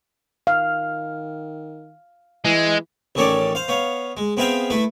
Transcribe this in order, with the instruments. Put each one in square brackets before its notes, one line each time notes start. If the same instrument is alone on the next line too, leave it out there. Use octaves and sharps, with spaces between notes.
[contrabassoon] D#3 [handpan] F5
[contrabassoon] E3 [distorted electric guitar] G#3
[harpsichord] A1 D#3 C#4 A4 C#5 D5
C5 F5
B3 C#5 F5
G#3
B3 C4 G#4 E5 F5 G5
A3 E4 B4